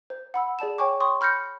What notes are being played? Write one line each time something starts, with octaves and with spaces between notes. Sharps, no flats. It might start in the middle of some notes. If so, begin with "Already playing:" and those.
C5
F#5 B5 E6
G#4 D5 A5 E7
C#5 G5 G#5 C#6 D6
G5 C6 C#6 D#6
B5 F6 G6 A#6 C#7